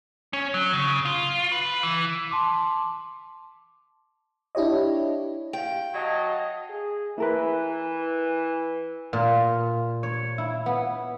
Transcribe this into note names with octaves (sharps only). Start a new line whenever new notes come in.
C#4
F#3
C#3
F4
B4
E3
A5 C6 D6
D4 E4 G4 C#5 D#5
G4 F5 G5
F#3 D#5 F5 F#5 A5
G#4
E3 E4 A#4 B4
A#2
C#5
E4
B3